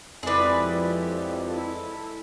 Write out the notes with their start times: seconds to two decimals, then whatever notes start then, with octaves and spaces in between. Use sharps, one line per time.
0.23 F2 G#3 E4 G4 G#4 B4 D5
1.47 E4 A4